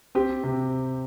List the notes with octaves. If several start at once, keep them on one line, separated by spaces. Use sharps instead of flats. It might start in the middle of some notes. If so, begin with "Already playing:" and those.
C4 G4
C3